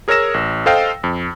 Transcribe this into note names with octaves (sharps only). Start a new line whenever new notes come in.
G#4 A#4 C#5 E6 A#6 E7
A1
A4 C5 D#5 F5 G5
F2